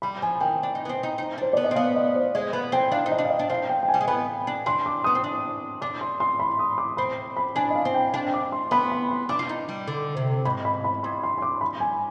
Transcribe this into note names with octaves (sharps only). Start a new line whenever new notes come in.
G3 B5
F3 G#5
D#3 G5
D4
D#4
B3
C4
D#4
D#4
D4 C5
B3 D5
D#5
C4
B3 F5
D#5
C5
G#3 D#5
B3 B5
C4 G5
D4 F5
D#4
D#5
D4
F5
D#5
D4
C4 F5
G5
G5
G#5
G3
G#3
B3 B5
D4
D4 C6
D6
B3 D#6
C4
D4
D4 D6
C6
C6
B5
D#6
D6
C4 B5
B5
D4 G#5
D#5
F5
C4
G5
D4 G5
D6
C6
B3 B5
B5
C6
D4 D6
F4
D#4
G3
D3
C3
G#2 B5
B5
B5
G2 C6
C6
C6
D6
B5
G#5